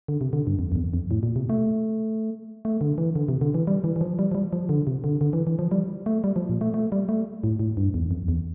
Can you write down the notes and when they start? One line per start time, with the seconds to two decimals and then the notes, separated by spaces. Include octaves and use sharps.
0.08 D3
0.21 C3
0.33 D3
0.47 G2
0.59 F2
0.72 F2
0.76 E2
0.93 F2
1.11 A2
1.23 A#2
1.36 C3
1.49 A3
2.65 A3
2.81 D3
2.98 E3
3.16 D3
3.29 C3
3.41 D3
3.54 E3
3.67 G3
3.84 E3
3.96 E3
4.01 F3
4.19 G3
4.31 F3
4.35 G3
4.53 F3
4.69 D3
4.87 C3
5.04 D3
5.21 D3
5.33 E3
5.47 E3
5.59 F3
5.71 G3
6.06 A3
6.24 G3
6.36 F3
6.49 A#2
6.61 A3
6.74 A3
6.92 G3
7.09 A3
7.44 A2
7.59 A2
7.77 G2
7.94 E2
8.11 F2
8.28 E2